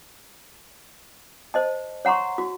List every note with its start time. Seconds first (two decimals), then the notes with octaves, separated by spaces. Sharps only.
1.54 C5 D#5 A5
2.05 C#5 F#5 A#5 C6 C#6
2.38 F#4